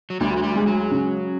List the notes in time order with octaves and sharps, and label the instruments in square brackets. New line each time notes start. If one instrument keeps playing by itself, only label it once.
[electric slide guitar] F#3
[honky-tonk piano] D2 [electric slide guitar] G3
[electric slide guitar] F#3
G3
[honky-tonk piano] G#3
[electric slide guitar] F#3
[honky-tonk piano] C#3